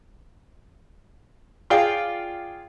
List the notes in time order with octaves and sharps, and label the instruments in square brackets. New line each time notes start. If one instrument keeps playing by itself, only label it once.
[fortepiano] F4 G#4 D5 F5 G5